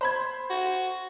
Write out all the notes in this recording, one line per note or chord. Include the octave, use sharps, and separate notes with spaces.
C5 B5 G#6
F#4